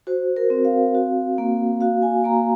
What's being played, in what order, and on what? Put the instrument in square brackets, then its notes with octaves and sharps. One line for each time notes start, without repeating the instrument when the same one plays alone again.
[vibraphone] F#4 C5
A#4
C4
F5
F#4
A#3
F#4 F5
G#5
A#3 A#5